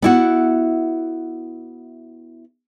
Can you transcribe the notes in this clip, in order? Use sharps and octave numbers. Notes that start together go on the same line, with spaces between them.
B3 E4 F#4